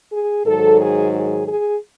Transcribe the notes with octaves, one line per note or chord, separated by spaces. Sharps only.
G#4
G#2 D#3 F#3 A4
G#4
G#4
G#4